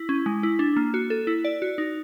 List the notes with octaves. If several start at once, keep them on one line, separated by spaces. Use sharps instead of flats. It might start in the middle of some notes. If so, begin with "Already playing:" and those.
Already playing: E4
C#4
G#3
E4
D4
A#3
F#4
A4
E4
D5
F#4
D#4